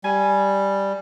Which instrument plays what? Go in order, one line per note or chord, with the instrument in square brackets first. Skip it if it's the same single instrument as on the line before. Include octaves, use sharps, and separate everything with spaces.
[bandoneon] G3 [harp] G#5